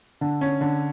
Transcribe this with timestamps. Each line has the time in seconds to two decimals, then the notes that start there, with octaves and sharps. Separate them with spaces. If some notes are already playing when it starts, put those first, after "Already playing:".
0.21 D3
0.41 C#4
0.61 D3